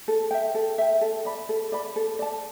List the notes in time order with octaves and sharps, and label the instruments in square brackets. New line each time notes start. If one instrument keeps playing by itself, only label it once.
[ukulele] A4
E5 G5
A4
E5 G5
A4
D5 B5
A4
D5 B5
A4
D5 A5